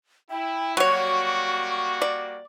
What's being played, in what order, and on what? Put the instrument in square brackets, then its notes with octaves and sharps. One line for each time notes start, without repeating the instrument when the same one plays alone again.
[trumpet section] E4 [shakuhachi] G5
[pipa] F#3 C#5 [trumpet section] G3 A#3 F#4 [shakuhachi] C#6
[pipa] D5